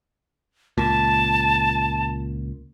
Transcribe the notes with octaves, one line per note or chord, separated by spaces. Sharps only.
C#2 A#2 A5